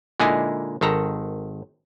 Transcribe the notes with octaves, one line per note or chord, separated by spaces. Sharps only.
A#2 D3 G#3 D#4 E4 G#4
G#1 D#3 A4 A#5